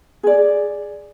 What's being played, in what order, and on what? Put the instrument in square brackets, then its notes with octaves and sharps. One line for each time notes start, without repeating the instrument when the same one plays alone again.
[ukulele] G#4 D5